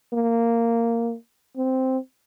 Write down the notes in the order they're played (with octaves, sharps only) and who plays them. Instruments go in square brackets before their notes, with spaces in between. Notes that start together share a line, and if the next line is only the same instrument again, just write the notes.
[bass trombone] A#3
C4